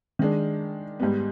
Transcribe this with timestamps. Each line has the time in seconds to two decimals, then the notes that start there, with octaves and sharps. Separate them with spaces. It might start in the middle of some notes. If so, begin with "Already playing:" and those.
0.19 D#3 G#3 D4
1.00 G#2 G3 B3